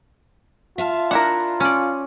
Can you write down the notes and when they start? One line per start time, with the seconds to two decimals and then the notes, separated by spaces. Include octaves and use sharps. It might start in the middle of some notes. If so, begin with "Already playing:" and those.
0.78 F4 E5 F5 A5
1.11 D4 E4 A#4 F#5
1.60 C#4 D5